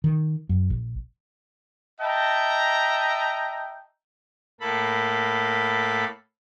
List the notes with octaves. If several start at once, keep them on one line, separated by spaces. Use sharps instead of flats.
D#3
F#2
A#1
D#5 E5 G5 A5 A#5
A2 A#3 A4 B5